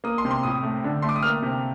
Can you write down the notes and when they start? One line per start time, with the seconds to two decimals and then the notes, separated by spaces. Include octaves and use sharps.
0.04 A#3 D#6
0.18 C6
0.25 C3
0.31 C6
0.43 A2 D#6
0.63 A3
0.84 D3
1.02 A3 C6
1.09 D6
1.16 D#6
1.23 A#3 F6
1.42 C3